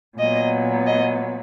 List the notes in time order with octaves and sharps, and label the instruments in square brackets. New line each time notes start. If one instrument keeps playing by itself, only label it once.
[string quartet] A#2 F#3 B3 D#5
D#5